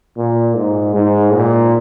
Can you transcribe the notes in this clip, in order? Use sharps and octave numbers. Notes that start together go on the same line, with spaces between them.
A#2
G#2
G#2
A#2